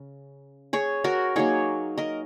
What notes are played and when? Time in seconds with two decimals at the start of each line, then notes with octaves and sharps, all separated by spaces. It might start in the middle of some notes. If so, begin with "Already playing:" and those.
Already playing: C#3
0.73 G#4 C#5
1.04 F#4 A#4
1.36 F#3 A#3 D#4 G#4 C#5
1.98 A#4 D#5